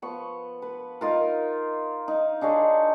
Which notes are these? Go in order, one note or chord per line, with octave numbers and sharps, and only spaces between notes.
F3 B3 C#6
B4
D#4 F4 A#4
D#4
D4 D#4 G#4 C#5